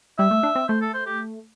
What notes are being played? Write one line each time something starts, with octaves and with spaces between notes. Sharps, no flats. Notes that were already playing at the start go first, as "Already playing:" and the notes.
G3 E5
A3
D4
C4
A3 C5
A4
C5
G4